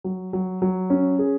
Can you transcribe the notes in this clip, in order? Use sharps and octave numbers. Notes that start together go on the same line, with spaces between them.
F#3
F#3
F#3
C#4
G#4